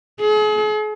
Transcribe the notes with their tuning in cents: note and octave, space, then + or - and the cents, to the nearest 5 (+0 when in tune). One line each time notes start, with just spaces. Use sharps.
G#4 +40